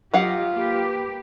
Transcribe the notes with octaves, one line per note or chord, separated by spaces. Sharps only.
F#3 F4 G4 D#5 F5 F#5
A#3 G4 B4